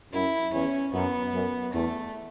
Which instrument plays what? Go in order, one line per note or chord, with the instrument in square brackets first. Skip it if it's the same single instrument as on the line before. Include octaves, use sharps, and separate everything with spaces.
[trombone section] F#2 [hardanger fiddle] E4
[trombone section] E2 [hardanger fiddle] C#4
[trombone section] F#2 [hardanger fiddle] B3
[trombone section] F#2
[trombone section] E2 [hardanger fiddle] A3